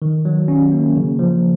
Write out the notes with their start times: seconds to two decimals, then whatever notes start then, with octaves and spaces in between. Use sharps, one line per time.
0.02 D#3
0.25 F#3
0.48 C#4
0.72 A#3
0.96 C#3
1.19 F3